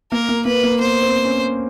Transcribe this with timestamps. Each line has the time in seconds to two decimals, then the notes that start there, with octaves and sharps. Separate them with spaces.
0.12 A#3 A#4
0.29 A#3
0.45 A#3 B4
0.63 A#3
0.79 B3 C5
1.02 C4
1.25 C#4